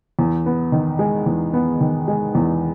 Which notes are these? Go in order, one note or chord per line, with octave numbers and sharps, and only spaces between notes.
E2
B3
D#3
G#3
E2
B3
D#3
G#3
E2